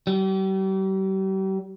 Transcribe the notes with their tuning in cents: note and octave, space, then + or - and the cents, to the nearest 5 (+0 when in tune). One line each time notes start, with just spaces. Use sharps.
G3 -40